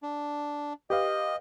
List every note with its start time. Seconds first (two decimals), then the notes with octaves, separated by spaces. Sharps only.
0.03 D4
0.90 G4 B4 D#5 F5